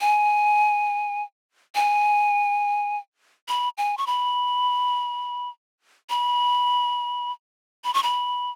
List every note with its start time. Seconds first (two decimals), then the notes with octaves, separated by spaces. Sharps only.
0.01 G#5
1.75 G#5
3.49 B5
3.78 G#5
3.98 C#6
4.07 B5
6.10 B5
7.84 B5
7.94 C#6
8.03 B5